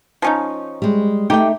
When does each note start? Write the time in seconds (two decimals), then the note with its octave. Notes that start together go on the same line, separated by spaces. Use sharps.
0.22 F3 C#4 D#4
0.82 G3 G#3
1.30 A3 D#4 G4 G5